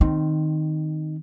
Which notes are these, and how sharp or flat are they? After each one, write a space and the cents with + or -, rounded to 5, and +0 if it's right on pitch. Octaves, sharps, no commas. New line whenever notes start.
D#3 -5 C4 -5